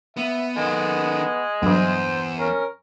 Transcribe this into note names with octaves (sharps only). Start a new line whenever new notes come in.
B3 E5
D#3 G#3 B3 A4
B1 E2 G2 C5
C#4 A#4